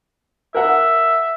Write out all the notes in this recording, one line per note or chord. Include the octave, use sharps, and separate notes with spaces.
A#4 E5 F#5